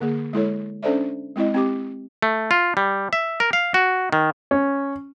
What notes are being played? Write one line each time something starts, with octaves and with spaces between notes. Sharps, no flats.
D3 A#3 G#4
G#3 E4 A4 C#5
C#4 D4 A4 C5 D5 E5
G#3 C4 E4 D#5
C4 G4 D6
A3
F4
G3
E5
A#4
F5
F#4
D#3
C#4